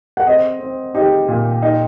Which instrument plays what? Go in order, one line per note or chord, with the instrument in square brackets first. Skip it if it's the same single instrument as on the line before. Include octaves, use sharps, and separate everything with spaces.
[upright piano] F#5
[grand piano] C4 [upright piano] D#5
[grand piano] C4
[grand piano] D#4 [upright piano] G4
[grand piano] A#2
D#4